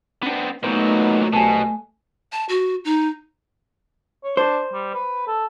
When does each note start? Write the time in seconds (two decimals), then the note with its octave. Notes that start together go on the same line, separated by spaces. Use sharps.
0.23 B3 C4 D4 D#4
0.64 A#2 F#3 A3 B3 D#4 C5
1.33 C2 B2 F#3 G#5 A5
2.32 A5
2.49 F#4
2.85 D#4
4.24 C#5
4.37 D4 C5
4.72 G3
4.94 B4
5.27 A4